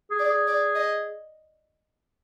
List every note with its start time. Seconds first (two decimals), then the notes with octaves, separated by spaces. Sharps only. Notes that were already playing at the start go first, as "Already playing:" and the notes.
0.10 G#4
0.19 D5
0.28 G#4
0.48 D5
0.75 D#5